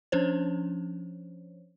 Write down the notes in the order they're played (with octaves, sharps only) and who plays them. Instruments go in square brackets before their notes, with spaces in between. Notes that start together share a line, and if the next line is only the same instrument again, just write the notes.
[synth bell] F3 C#4 D4 C5 C#5